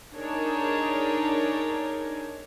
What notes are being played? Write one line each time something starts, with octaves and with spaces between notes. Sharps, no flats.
D4 D#4 G#4 A#4 C#5